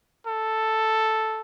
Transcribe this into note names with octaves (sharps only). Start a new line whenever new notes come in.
A4